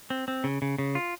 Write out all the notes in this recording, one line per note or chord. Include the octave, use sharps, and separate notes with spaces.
C4
C4
C#3
C#3
C#3
F4